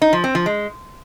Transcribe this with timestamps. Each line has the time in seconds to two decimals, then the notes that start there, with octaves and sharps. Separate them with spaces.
0.02 D#4
0.13 F3
0.24 C4
0.35 F3
0.46 G#3